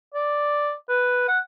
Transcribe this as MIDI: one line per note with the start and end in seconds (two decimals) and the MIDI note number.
0.14 0.74 74
0.89 1.23 71
1.28 1.39 78